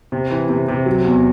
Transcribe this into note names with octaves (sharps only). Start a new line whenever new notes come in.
C3
E3
C3
C3
F#3
E2